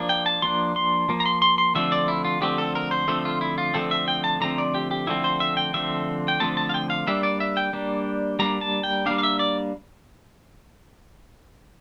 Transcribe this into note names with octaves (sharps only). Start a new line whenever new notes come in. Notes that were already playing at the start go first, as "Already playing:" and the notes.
Already playing: F3 A#3 D4
G5
A5
F3 A#3 D4 C6
C6
F3 A#3
A#5
C6
C6
C6
D3 F3 A3 C4 E5
D5
E4
F4
D3 F3 A3 C4 G4
A4
A#4
C5
D3 F3 A3 C4 A4
F4
E4
F4
D3 F3 A3 C4 A4
E5
G5
A5
D3 F3 A3 C4 A#5
D5
G4
G4
D3 F3 A3 C4 E4
C5
E5
G5
D3 F3 A3 C4 E5
G5
D3 F3 A3 C4 A5
A5
F5
G5
F5
G3 A#3 D4 E5
D5
E5
G5
G3 A#3 D4
G3 A#3 D4 A#5
A5
G5
G3 A#3 D4 F5
F5
E5
D5